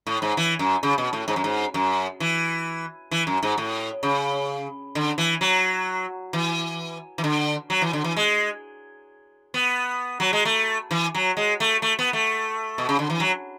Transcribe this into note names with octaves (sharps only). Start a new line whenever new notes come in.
A2
G#2
E3
F#2
C#3
B2
A2
G#2
F#2
G#2
F#2
E3
E3
F#2
G#2
A2
C#3
D3
E3
F#3
E3
E3
D3
F#3
E3
D3
E3
G#3
B3
F#3
G#3
A3
E3
F#3
G#3
A3
A3
B3
A3
B2
C#3
D3
E3
F#3